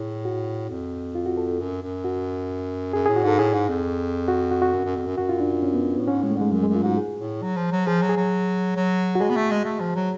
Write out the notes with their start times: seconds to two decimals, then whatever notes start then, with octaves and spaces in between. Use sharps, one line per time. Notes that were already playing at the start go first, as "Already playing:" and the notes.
Already playing: A2 G#4
0.25 F#4
0.70 F2
1.15 F4
1.26 F#4
1.37 A4
1.60 F#2
1.82 F#2
2.04 F#4
2.93 F#2 G#4
3.06 A2 G#4
3.16 F#4
3.24 G#2 A4
3.39 A2 G#4
3.54 G#2
3.69 F2
4.28 F#4
4.51 F#4
4.62 F#4
4.73 F#2
4.85 F#2
4.96 F2
5.07 F#2
5.18 F#2 F#4
5.29 F4
5.40 D4
5.63 C#4
5.74 B3
5.96 A2 B3
6.07 G#2 C#4
6.23 A2 G#3
6.31 A3
6.37 G#2 G#3
6.52 F#2 F#3
6.63 F#2 G#3
6.75 F4
6.83 G#2 F#4
6.97 G#4
7.20 A2
7.42 F#3
7.57 F3
7.72 F#3
7.87 F3 G#4
8.02 F#3
8.09 G#4
8.17 F#3
8.76 F#3
9.15 F#4
9.21 G#3 G#4
9.30 B3
9.37 A3
9.51 G#3
9.65 A3
9.80 F3
9.96 F#3